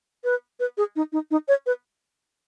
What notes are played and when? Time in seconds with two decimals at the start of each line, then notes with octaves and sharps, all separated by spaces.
0.24 B4
0.60 B4
0.77 G#4
0.96 D#4
1.13 D#4
1.31 D#4
1.48 C#5
1.66 B4